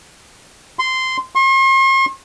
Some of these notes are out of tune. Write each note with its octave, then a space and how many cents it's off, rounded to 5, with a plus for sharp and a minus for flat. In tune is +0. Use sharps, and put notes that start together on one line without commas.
C6 -10
C6 +45